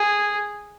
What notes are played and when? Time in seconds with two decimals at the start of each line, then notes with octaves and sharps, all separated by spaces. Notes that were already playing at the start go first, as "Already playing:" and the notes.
Already playing: G#4